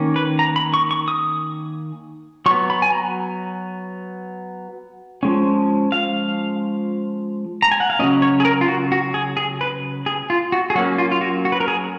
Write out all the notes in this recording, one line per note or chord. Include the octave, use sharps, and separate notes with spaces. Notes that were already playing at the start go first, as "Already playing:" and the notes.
Already playing: D#3 A#3 C#4
B4
A#5
B5
C#6
C#6
D#6
F#3 B3 C#6
B5
G#5
A#5
F3 G#3 C#4
F5
A#5
G#5
F#5
F5
C#3 F#3 A#3 C#4 D#5
C#5
G#4
A#4
F4
F#4
F#4
G#4
G#4
B4
G#4
F4
F#4
G#4
F#3 A#3 C#4 F#4
F4
F4
F#4
F#4
B4
A#4
G#4